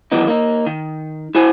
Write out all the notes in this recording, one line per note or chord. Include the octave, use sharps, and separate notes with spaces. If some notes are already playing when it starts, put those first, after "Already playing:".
D#3 E3 F#3 B3 D#4
A#3 D#4
D#3
E4 F#4 C5 G#5